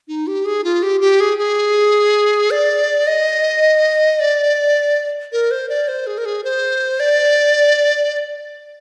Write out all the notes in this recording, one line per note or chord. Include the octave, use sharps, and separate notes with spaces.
D#4
G4
G#4
F4
G4
G4
G#4
G#4
D5
D#5
D5
A#4
C5
D5
C5
G#4
A#4
G#4
C5
D5